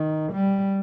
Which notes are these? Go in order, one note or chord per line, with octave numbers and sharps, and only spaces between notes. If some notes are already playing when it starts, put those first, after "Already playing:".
Already playing: D#3
G3